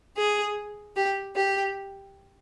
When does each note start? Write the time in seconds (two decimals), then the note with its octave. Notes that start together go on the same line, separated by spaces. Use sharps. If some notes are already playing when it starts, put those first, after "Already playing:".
0.17 G#4
0.95 G4
1.35 G4